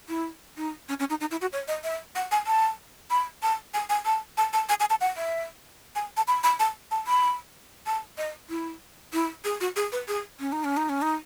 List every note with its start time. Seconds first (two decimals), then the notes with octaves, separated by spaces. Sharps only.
0.09 E4
0.57 D#4
0.89 C#4
0.99 C#4
1.10 D#4
1.21 D#4
1.31 E4
1.41 F#4
1.53 C#5
1.68 D#5
1.84 E5
2.15 F#5
2.32 G#5
2.47 A5
3.10 B5
3.43 A5
3.74 G#5
3.90 G#5
4.05 A5
4.37 A5
4.53 A5
4.69 G#5
4.80 G#5
4.90 A5
5.01 F#5
5.17 E5
5.96 G#5
6.17 A5
6.28 B5
6.43 B5
6.59 A5
6.91 A5
7.07 B5
7.86 A5
8.18 D#5
8.50 E4
9.13 E4
9.45 G#4
9.61 F#4
9.76 G#4
9.92 B4
10.08 G#4
10.40 C#4
10.52 D#4
10.64 C#4
10.77 D#4
10.89 C#4
11.02 D#4